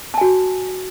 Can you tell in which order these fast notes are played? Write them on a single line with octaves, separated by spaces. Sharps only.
A5 G#5 F#4